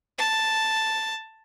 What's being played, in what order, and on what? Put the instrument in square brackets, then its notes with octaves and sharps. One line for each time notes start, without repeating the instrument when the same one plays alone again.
[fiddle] A5